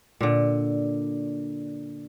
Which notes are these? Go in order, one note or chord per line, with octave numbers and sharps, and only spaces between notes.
A#2 D3